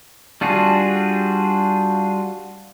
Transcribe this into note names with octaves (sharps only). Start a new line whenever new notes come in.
G3 D4 F4 F#4 G#4